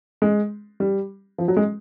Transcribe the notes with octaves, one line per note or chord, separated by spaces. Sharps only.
G#3
G3
F3
F#3
G#3